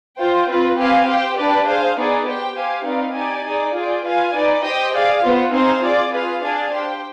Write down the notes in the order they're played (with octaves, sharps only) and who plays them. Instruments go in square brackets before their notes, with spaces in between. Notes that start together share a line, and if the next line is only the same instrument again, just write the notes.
[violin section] F4 C5 G5
C4 F4 B4
C4 G4 B4 F5 G#5
G4 C5 G5
D4 G4 B4 D5
G#4 C5 F5
B3 D#4 G#4 D5
G4 C5 G5
G4 C5 F5 G#5
C4 D#4 B4 D5 F5
D#4 G4 D5 G#5
D#4 G#4 D5
F4 G#4 D5 G5
F4 B4 F5 G#5
D#4 B4 D5
G4 C5 D#5 G5
G#4 D5 F5
B3 F4 C5
C4 D#4 G#4 C5 F5
F4 G#4 D5
F4 G#4 B4 F5
D4 G#4 D5 F5 G#5
G4 C5 G5